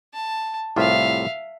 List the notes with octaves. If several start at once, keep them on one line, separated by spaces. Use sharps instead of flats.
A5
C2 A2 F4 E5 F5